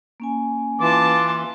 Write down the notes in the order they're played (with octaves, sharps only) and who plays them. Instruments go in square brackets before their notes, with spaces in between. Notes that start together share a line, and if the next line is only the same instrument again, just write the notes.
[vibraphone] A#3 C#4 G#5
[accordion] E3 [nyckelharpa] F4 A5 [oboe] D6